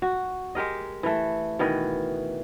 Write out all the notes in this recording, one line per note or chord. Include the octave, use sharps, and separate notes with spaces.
F#4
G#3 G4 A#4 D#5
E3 A3
B2 D#3 E3 D#5